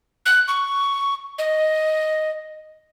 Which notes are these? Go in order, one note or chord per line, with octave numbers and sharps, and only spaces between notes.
F#6
C#6
D#5